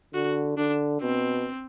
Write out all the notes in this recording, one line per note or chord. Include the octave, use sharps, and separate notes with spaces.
D3 F#4
D3 D4
B2 C4